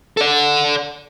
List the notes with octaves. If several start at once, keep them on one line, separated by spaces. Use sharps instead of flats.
A4 D5